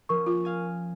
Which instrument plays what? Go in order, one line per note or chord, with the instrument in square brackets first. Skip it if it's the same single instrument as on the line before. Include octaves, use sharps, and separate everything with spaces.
[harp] F3 A#3 C#4 [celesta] A#4 C#6
[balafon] F4
[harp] F5 G#5 D#6